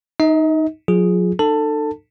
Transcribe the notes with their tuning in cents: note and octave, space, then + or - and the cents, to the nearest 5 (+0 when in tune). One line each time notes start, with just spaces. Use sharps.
D#4 +0 D#5 +40
F#3 -40 F4 +5 G#4 +0
D#4 -45 A4 +20 A5 +15